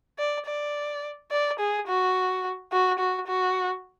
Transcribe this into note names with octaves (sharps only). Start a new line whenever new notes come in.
D5
D5
D5
G#4
F#4
F#4
F#4
F#4